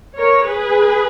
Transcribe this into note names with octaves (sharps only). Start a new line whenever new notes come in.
A#4 C#5
G#4 B4